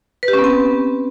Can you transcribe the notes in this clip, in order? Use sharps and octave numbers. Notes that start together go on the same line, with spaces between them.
B4
G4
C#4
B3
C4